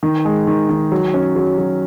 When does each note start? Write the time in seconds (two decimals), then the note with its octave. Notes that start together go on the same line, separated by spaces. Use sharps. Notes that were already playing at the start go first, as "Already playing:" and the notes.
0.03 D#3
0.25 G#3
0.47 D#3
0.69 D#3
0.92 F#3
1.14 C#4
1.36 F#3
1.58 F#3